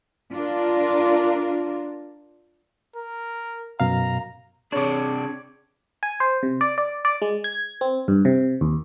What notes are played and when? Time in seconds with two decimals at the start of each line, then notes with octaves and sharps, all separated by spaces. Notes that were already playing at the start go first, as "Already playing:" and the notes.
0.33 D4 F4 A#4
2.96 A#4
3.80 F#2 B2 F5 A#5
4.72 C3 D4 G#4 C#5 D6
6.03 G#5
6.20 C5
6.43 C3
6.61 D5
6.78 D5
7.05 D5
7.22 G#3
7.44 G#6
7.81 C4
8.08 G2
8.25 C3
8.61 D#2